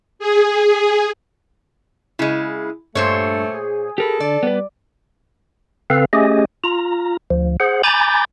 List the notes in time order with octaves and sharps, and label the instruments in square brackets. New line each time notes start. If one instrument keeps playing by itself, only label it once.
[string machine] G#4
[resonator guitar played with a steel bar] C#3 G#3 [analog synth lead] E4
[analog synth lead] G2 [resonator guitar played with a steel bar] A#2 C5 C#5 [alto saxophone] A3
[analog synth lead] G#4
[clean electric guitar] G4 A#4 B5 [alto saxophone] A4
[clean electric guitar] D3 [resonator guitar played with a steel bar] D5
[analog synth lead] G3 [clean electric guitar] B3 B4
[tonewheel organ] C#3 C4 A4 B4 F5
A3 C#4 G4 G#4 D#5
F4 A#5
D2 F3
G#4 C5 F#5
G#5 A#5 B5 D6 G6 A6